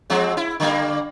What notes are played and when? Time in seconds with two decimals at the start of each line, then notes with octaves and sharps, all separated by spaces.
0.10 F3 G#3 C4
0.37 E4
0.60 D3 G3 A#3